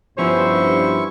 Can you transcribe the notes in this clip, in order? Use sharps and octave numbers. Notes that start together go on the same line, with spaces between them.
G2 F3 B3 C#4 E4 C5 C#6